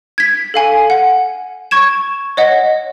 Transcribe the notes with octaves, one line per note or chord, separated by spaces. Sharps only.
G#6 B6
A4 F5 G#5
F#5
C#6 G#6 E7
C#5 D#5 F#5